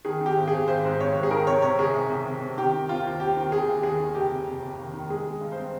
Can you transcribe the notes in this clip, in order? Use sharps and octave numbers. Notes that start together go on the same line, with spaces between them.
D#3 G#4
D#3 G4
G#1
G#1 G#4
G#1 C5
G#2
G#1 C#5
G#2
G#4
D#3 A#4
C3 C#5
C2 C#5
C2 G#4
C2
C2
C3
C3
D#3 G4
D#3
C4 F4
D#2
C4 G4
D#3
D#2 G#4
D#2
D#2 G#4
D#3
F1 G4
F1
F1
F1
D#2
D#3
G#3 G#4
G#3
G2
C5
C4